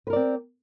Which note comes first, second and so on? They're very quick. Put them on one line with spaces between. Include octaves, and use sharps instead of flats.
B4 A#4 D5 C4